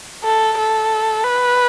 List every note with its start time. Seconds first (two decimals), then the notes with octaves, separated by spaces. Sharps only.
0.24 A4
0.58 A4
1.24 B4